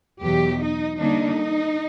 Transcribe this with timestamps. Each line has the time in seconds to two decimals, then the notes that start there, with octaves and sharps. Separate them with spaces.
0.23 E2 B2 F#3 G4
0.62 D#4
0.99 D3 G3 A#3 D4 D#4